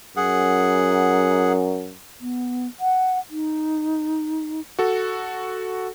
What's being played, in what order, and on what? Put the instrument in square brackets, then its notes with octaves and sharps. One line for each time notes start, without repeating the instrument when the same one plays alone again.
[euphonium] F#2 [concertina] G#4 F#5
[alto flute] B3
F#5
D#4
[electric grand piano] F#4 A4